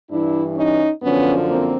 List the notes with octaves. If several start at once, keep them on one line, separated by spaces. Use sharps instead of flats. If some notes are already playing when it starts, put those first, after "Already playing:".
G2 E3 D4 E4
C#4 D#4
F#2 D3 F3 B3 C#4
A#3 C4